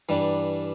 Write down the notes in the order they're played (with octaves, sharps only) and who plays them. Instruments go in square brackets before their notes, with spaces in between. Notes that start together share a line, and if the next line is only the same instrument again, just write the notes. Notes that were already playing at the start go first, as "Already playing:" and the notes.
[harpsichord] G2 E3 G3 D4